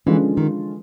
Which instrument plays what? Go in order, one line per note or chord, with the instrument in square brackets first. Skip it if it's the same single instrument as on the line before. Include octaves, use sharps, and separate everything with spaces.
[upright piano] D3 F3 G#3 C#4 F4 [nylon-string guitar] E3
[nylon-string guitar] D#3